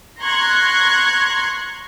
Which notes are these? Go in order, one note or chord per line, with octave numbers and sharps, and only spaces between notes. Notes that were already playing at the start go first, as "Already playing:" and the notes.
A#5 C6 C#6 F#6 G#6